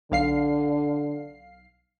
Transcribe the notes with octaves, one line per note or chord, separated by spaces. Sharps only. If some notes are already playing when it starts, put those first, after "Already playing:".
B1 D3 F5 C7